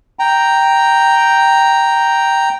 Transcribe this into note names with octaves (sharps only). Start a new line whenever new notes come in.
G5 A#5